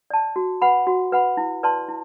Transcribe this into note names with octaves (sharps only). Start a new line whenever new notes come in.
D5 A5
F#4
B4 F#5 B5
F#4
B4 F#5 B5
E4
B4 D5 A5 C6
E4